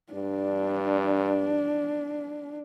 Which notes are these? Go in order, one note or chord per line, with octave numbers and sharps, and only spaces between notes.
G2 D4